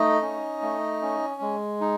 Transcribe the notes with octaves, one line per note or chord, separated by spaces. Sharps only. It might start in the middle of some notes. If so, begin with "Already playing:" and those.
Already playing: A3 D#4 D#5
C#4
A3
C#4
G#3
D#4